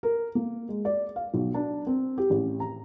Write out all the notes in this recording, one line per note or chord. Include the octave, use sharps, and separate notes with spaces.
A#4
A#3
G#3
D5
F5
B1
D4
C4
G4
A1
A#5